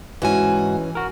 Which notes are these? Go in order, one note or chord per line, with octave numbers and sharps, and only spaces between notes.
G#2 E3 C#4 F#4 G#5
F#4 A#4